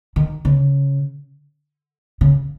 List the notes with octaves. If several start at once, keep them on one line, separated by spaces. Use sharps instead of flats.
D#3
C#3
C#3